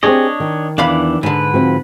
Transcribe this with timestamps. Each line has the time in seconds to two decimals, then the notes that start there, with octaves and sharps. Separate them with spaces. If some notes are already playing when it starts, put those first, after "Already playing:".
0.03 C4 D4 G4 G#4 C#5 D#5
0.40 D#3
0.78 E2 E3 D4 F5 B5
1.23 G#2 D3 B4
1.54 F3 C4 F#4